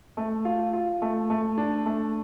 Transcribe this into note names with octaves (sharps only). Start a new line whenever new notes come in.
A3
F4
F4
A3
A3
D4
A3